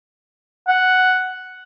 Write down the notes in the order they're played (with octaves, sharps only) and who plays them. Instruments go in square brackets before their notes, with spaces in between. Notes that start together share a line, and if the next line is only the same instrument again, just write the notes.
[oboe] F#5